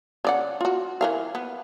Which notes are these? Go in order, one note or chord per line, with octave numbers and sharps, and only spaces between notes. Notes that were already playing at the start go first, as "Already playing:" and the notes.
C#3 D5 F#5
F4 F#4
E3 A#4 F5
B3